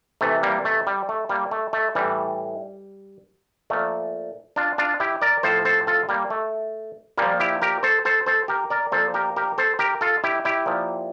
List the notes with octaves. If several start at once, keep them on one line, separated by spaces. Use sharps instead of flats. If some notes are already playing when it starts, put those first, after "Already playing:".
C3 E3 A3
G3 A#3
A3
G3
A3
G3 A#3
A3
A3
A2 E3 G3
A#2 F3 A3
D4 F4
D4 F4
E4 G4
A#4 D5
A2 F3 A4 C5
A4 C5
F4 A4
G3 A#3
A3
A#2 F3 G3 A#3
E4 G4
G4 A#4
A4 C5
A4 C5
A4 C5
G4 A#4
A#4 D5
A#2 F3 A4 C5
G4 A#4
G4 A#4
A4 C5
G4 A#4
F4 A4
E4 G4
E4 G4
A#2 F3